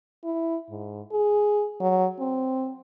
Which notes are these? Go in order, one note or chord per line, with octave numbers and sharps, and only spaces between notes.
E4
G#2
G#4
F#3
C4